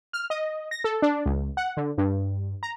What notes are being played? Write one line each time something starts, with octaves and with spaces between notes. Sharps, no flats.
F6
D#5
A#6
A4
D4
C#2
F#5
D3
G2
A#5